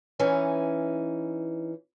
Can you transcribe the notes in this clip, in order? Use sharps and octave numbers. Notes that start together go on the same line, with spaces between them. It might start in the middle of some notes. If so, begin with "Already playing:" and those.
E3 C#4 D#4